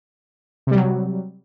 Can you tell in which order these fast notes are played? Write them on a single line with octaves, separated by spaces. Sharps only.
C3 G3 F#3